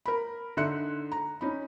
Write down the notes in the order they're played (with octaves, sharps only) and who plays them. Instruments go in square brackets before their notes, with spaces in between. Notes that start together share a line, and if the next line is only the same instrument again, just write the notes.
[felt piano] A#4 B5
D3 D#4 E5 C6 F#6 C#7
A#5
C#4 D#4 B5